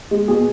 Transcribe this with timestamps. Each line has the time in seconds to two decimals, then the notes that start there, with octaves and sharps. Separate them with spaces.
0.11 G#3
0.28 B2 G#4